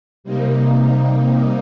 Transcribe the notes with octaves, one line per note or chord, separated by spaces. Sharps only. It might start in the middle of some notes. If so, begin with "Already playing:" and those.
C3 G3 A#3 D#4